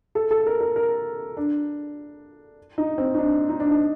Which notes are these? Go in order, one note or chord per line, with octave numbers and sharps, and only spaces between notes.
A4
A4
A#4
A#4
A#4
D4
D#4
C4
D#4
D4
D#4
D4
D#4